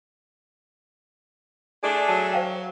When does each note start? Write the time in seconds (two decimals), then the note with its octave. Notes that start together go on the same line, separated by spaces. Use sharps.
1.83 A3 D4 G#4 D5
2.08 F#3 A5 D#7
2.33 C5 F5 G5